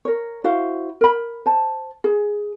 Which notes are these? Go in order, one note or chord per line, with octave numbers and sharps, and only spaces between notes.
A#4 C#5
E4 F#4 C5 F5
A#4 B5
C5 A5
G#4